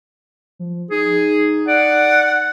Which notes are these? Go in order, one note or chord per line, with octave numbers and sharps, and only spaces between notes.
F3
D#4 G#4
D5 F#5